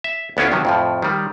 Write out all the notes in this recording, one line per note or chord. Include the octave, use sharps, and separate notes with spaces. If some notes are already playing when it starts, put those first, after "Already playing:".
E5
D2 B3 C#4 E4 F4
C3 D#3 F3 F#3
F2 A2 F3
D#3 G3